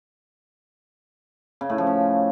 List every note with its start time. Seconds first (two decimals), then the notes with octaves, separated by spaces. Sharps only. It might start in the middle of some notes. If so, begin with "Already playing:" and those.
1.61 C#3
1.70 A2
1.78 F3
1.87 C#4